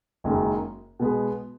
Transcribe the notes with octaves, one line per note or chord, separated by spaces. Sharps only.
F#1 F#2 D#3 G#3
B2 G#3 B3